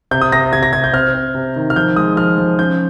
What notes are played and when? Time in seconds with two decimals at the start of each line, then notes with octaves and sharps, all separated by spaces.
0.11 C3 G6
0.22 D#6
0.32 C3 A#6
0.53 C3 G#6
0.63 A#6
0.73 C3 G#6
0.84 G6
0.93 C4 F6
1.14 C4
1.35 C3
1.56 D#3
1.70 F6
1.76 F3 G6
1.96 G#3 D#6
2.17 F3 F6
2.38 F3
2.58 C#4 G6